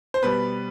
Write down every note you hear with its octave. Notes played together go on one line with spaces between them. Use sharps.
C5
B2 G3 B4